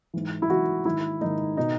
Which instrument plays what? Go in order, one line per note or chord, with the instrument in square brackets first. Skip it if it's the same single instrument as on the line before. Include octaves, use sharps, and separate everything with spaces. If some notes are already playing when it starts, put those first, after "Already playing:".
[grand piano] G#2 E3
E4
G#2 E3 F#4
G#2 D#3 E4
G#2 D#3 D#4
B2 D#4